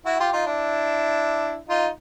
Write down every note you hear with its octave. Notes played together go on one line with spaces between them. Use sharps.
E4 F#4
F4 G4
D#4 F4
D4 E4
D#4 F4